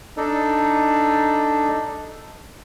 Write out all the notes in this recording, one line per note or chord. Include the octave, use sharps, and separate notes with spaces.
D4 D#4 A4